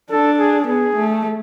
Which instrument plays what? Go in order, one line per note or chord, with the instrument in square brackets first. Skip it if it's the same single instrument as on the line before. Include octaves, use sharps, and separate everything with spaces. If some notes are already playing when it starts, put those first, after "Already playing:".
[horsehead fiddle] D4 [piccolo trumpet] A4
[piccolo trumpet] G#4
[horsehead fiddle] B3 [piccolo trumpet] G#4
[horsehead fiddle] A3